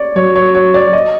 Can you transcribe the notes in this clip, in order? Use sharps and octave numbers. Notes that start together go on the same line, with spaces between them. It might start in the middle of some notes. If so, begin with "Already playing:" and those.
Already playing: C#5 D5
F#3 C#5
C#5
C#5
D5
D#5